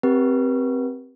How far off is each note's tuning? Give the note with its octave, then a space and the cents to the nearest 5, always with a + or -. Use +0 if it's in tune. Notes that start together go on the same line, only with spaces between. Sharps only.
C4 +0 G4 +0 B4 -40